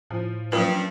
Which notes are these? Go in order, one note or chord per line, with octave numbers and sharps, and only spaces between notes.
A2 F3
G2 F3 F#3 A#3 C#4 B4